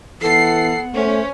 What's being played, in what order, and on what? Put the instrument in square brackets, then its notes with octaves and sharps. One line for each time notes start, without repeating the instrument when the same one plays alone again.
[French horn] E3 [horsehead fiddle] B3 F#5 [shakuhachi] A4 [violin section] C7
[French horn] A3 [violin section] C#4 [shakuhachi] C5